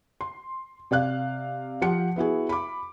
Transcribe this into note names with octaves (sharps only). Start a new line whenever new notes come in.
C6
C3 D5 F5 F#6
F3 G4 F#5 C#7
B3 E4 F#4 G#4
B5 D6